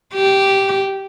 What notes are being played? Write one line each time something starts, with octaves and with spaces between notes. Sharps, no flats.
G4